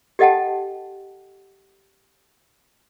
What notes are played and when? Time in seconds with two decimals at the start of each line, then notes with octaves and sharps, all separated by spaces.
0.19 G4 A4 D#5 F#5 G5 A5